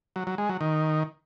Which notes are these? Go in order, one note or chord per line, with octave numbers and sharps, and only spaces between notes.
F#3
F#3
G#3
F#3
D#3